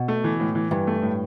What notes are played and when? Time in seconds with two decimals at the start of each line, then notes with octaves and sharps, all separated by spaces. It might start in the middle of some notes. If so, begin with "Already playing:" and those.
Already playing: B2
0.08 A3
0.24 E3
0.40 A2
0.55 E3
0.71 G2 E3
0.87 A3
1.02 A2